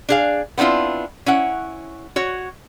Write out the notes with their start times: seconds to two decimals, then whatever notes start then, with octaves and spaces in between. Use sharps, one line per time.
0.09 D4 G#4 F5
0.58 B3 C4 D4 E4 F4
1.26 C#4 E4 F#5
2.16 F#4 C#5